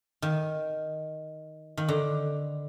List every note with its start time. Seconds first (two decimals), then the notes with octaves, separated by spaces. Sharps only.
0.22 D#3
1.77 D#3
1.88 D3